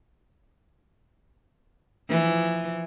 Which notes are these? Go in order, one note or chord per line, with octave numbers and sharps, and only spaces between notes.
E3 F3